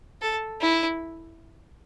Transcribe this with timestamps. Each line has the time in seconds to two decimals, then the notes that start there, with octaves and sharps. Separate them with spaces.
0.22 A4
0.61 E4